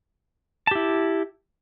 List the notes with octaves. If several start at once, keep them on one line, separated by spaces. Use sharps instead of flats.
E4 G4 A5